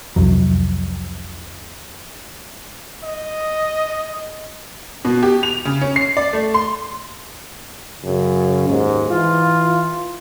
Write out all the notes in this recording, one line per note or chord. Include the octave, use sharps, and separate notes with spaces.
C2 F2 F#3
D#5
B2
G4
F7
C#3
C#4
C7
D5
A3
C6
F#2 C#3
D#2 G#2
E3 F4